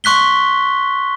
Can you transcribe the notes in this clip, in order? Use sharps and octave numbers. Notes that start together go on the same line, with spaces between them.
C6 C#6 F#6 B6 G7